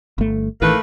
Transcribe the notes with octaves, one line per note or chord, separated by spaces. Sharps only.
G1 A3
A1 D#3 E3 A3 A#3 B4